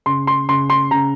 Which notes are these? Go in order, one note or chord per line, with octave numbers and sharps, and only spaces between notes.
C#3 C6
C6
C#3 C6
C6
C#3 A#5